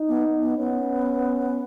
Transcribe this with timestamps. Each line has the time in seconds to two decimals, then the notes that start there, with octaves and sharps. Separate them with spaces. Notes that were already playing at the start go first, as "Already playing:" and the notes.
Already playing: D#4
0.08 B3
0.42 B3
0.58 B3 C#4